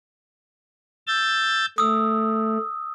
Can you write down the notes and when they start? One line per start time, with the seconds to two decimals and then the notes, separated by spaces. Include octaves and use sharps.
1.07 E6 G6 A6
1.78 A3 D#6 E6